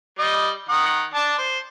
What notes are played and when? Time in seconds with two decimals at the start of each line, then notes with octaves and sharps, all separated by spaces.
0.19 G3 D#5
0.69 D#3 F#5 D#6
1.14 D4 A5
1.38 C5